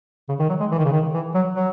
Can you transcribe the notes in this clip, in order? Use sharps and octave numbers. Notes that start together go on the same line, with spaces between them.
C#3
D#3
F#3
G#3
E3
D#3
C#3
D#3
E3
F#3
F#3